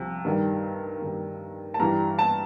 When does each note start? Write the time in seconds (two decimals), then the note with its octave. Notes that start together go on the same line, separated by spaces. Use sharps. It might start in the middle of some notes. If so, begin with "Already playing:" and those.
Already playing: C2 C3 F3
0.25 G2 D#3 G3
1.02 G2 D#3 G3
1.74 A5
1.80 G2 E3 G3 A#5
2.19 A5